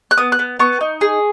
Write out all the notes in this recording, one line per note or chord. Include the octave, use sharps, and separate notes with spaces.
F#6
B3 D#6
F#6
B3
B3 C#6
D#4
G#4